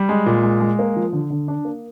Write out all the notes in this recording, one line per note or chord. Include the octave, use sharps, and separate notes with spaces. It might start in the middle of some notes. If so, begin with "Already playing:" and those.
Already playing: G3
G#3
A#2
G#3
G#3
A#3
F3
D3
D3
D4
A#3